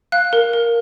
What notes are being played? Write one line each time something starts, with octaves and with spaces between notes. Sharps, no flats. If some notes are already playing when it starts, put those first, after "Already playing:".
F5 F#6
A#4
A#4